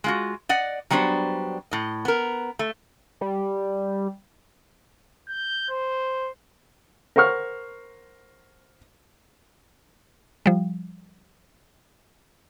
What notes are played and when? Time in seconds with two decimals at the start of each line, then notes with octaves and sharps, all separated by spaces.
0.04 G#3 F4 F#4
0.49 D5 D#5 F#5
0.90 F#3 G3 B3 D4 C5
1.71 A2 D#5
2.05 B3 A#4
2.59 A3
3.21 G3
5.29 G6
5.70 C5
7.16 A#4 C5 F#5 C#6 F6
10.46 F3 G3